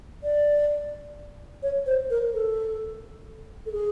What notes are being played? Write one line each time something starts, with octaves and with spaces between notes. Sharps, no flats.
D5
C#5
C5
A#4
A4
A4
G#4